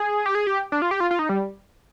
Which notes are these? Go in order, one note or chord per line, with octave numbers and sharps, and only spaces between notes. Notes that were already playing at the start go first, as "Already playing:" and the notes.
Already playing: G#4
G4
G#4
G4
D4
F4
G4
F4
F4
D#4
G3